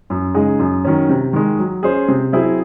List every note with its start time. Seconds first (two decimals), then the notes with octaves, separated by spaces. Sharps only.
0.10 F#2
0.34 C#3 G#3 D#4 G#4
0.59 F#2
0.85 D#3 F#3 C#4
1.09 C3
1.33 D#3 G#3
1.59 F#3
1.83 C#4 G#4 C5
2.08 C3
2.33 F#3 C4 E4 G#4